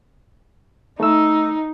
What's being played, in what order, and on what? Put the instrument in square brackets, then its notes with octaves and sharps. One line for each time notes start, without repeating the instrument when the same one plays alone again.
[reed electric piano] A3 E6 [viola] D#4